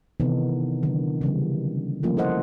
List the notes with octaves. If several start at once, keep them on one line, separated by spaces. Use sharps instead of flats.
C3 D#3 E3 B3 D#4 A4
D3 D#3 F#3
C#3 E3 G3
F3 G3 A3 A#3 C#4 F4
E4 F4 A4 C5 D#5 F#5